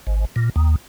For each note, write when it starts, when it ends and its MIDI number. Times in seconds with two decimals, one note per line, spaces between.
0.07 0.25 32
0.36 0.50 46
0.56 0.76 39